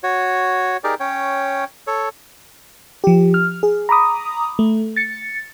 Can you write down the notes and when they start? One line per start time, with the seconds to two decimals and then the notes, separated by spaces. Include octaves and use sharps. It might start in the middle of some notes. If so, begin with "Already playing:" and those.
0.03 F#4 C#5
0.84 D#4 G4 G#4 A#4 D5
1.00 C#4 C#5 G5
1.87 A4 C#5
3.04 F3 G4
3.34 F6
3.63 G#4
3.89 A#5 B5 D6 D#6
4.59 A3
4.96 A6 C#7